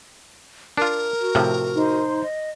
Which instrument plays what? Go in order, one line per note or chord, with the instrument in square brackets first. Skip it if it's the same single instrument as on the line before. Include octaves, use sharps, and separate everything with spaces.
[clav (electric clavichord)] D4 F4 [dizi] A#4
[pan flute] F#4
[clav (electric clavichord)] A2 C3 F3
[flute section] D#4 C5 C6
[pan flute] D#5